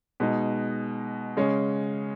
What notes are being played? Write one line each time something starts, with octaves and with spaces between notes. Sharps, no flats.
B2 G#3 D#4
C#3 G#3 C#4